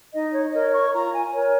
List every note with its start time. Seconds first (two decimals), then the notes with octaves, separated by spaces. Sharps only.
0.14 D#4 D#5
0.34 C#5
0.53 A#4 C#5 D#5
0.73 C#6
0.92 F4 A#5
1.13 G#5
1.32 A#4 C#5